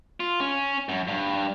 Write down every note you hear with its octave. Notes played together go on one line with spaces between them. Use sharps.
F4
C#4
F#2
G2